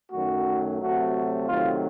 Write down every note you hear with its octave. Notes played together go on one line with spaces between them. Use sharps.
F#2 D#3 F#3 A3 F#4
C3 F#3 A3 F#4
C3 D#3 F#3 A3 F4